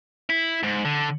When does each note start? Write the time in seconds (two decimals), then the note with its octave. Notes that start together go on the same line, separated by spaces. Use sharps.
0.30 E4
0.64 G#2
0.85 D3